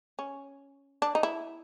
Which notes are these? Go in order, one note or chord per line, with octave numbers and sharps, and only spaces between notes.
C#4
D4
D#4
E4